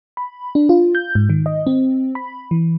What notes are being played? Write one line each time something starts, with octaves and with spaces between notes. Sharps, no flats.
B5
D4
F4
G6
G#2
D#3
D#5
C4
B5
E3